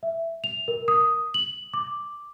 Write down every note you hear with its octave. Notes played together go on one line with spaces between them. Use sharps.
E5
F7
A#4
D#6
F#7
D6